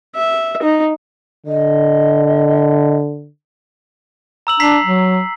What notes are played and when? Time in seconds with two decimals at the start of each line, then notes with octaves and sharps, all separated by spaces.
0.15 E5
0.63 D#4
1.46 D3 D#5
4.47 A#5 E6 F#7
4.60 D4 A#5 B6 C7
4.84 F#3